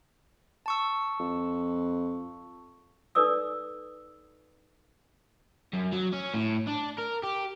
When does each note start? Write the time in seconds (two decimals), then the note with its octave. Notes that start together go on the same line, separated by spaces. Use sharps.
0.66 A5 C#6 E6
1.20 F2
3.15 D#4 A4 B4 D5 D#6 E6
5.73 F#2
5.92 F#3
6.13 C#4
6.34 A2
6.68 D4
6.99 A#4
7.24 G4